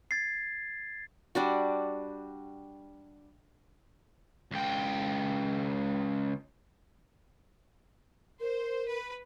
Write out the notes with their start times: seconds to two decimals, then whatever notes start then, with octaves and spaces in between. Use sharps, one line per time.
0.11 G#6 A6 C7
1.35 G3 D4 F#4
4.53 C#2 G5
8.40 A#4 C5
8.86 B4